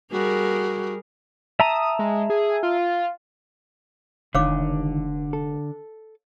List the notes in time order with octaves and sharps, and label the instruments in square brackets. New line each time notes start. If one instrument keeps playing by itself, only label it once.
[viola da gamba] G3 G#4 A#4 [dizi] F#4
[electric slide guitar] E5 A5 A#5 [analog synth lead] D#6
[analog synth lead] G#3
G#4
F4
[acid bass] F1 [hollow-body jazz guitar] C#2 D#3 [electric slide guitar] D3 [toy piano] C#5 F5 D6
[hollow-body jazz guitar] A4